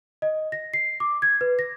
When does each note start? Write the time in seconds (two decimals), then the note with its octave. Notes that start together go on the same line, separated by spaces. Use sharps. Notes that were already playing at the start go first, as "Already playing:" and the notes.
0.22 D#5
0.52 A#6
0.74 C7
1.00 D6
1.22 G#6
1.41 B4
1.59 A#6